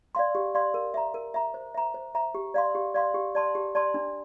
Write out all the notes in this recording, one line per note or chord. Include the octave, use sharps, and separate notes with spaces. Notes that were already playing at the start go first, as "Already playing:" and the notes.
D5 F5 C6
G4
D5 F5 C6
A#4
E5 A#5
A#4
E5 A#5
C5
E5 A#5
C5
E5 A#5
G4
D5 F5 C6
G4
D5 F5 C6
G4
D5 A5 C6
G4
D5 A5 C6
D4